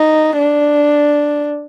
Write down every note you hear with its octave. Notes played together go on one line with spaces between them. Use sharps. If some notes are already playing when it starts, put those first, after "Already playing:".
Already playing: D#4
D4